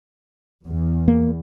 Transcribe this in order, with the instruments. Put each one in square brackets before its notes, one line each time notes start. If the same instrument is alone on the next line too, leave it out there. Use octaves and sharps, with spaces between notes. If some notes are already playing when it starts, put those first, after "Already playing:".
[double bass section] E2
[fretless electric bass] A#3